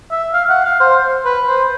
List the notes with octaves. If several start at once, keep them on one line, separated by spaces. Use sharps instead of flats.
E5
F5
F#5
F5
C5
B4
C5